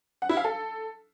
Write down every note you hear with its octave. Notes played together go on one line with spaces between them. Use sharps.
F#5
E4
F5
A4